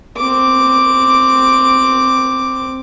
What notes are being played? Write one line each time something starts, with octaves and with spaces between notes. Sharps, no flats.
C4 D6